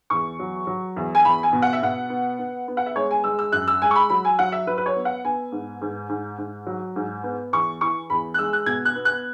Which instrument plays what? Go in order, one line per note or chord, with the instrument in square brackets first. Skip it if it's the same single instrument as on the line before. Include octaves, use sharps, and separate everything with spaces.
[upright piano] E2 C#6
F#3
F#3
E2
G#5
E2 B5
G#5
B2
F#5
E5
B2 F#5
B3
B3
B3
F#5
E5
G#3 C#5
G#5
G#3 E6
E6
F#2 F#6
E6
G#3 G#5
C#6
B5
F#3 B5
G#5
F#3 F#5
E5
F#3 B4
B4
C#5
B3
F#5
B3 G#5
G#2
G#2
G#2
G#2
F#3
G#2
B3
E2 C#6
E3 C#6
E2 B5
F#6
G#3 E6
F#6
B2 G#6
F#6
B3
F#6